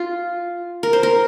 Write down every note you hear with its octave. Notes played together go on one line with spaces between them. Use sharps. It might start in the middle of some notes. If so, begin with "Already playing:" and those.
Already playing: F4
A#4
C5
A#4